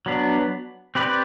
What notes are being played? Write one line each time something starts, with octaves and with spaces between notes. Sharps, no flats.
F#3 B3 D4
C4 G4 B4 D5